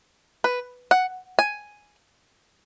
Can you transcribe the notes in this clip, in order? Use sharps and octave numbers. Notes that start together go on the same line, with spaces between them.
B4
F#5
G#5